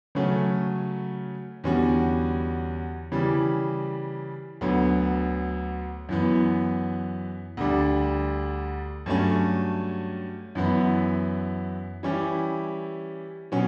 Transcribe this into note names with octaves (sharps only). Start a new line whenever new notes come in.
C#3 F#3 A3 C#4
E2 D3 G3 C#4 F#4
C#3 E3 G3
D2 D3 F#3 B3
F#2 E3 B3
D2 D3 G3 D4
G2 F#3 A3 C#4
F#2 E3 B3 E4
E3 G3 C#4 E4 G4
B2 F#3 C#4